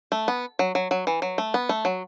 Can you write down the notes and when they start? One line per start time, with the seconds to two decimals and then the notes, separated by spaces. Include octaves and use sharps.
0.12 A3
0.28 B3
0.59 F#3
0.75 F#3
0.91 F#3
1.07 E3
1.22 F#3
1.38 A3
1.54 B3
1.69 A3
1.85 F#3